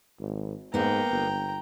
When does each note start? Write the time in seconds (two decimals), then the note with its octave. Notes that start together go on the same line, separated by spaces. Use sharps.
0.20 G#1
0.74 G#2 A#3 B3 G5 A#5
1.11 G1